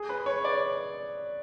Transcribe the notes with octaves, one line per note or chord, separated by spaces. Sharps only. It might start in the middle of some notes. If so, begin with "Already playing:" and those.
Already playing: G#4
B4
C#5
D5